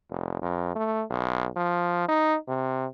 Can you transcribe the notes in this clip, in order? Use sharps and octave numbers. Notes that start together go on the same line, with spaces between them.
F1
F2
A3
B1
F3
D#4
C3